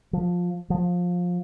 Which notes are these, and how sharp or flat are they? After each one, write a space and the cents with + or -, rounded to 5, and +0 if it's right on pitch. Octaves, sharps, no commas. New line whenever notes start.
F3 +15
F3 +20